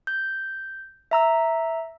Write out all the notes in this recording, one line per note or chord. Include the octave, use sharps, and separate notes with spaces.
G6
E5 A#5 E6